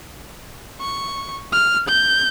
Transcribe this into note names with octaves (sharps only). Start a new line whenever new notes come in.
C#6
F6
G6